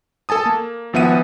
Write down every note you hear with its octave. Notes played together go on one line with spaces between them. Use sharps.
A4 G#5 A5 D#6
A#3
G#1 F3 B3 E5 F#5 D#7